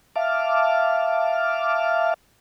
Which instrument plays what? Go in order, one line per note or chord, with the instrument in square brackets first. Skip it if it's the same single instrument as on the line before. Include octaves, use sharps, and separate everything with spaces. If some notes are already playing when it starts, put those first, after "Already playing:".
[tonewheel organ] E5 F5 A5 D6 F6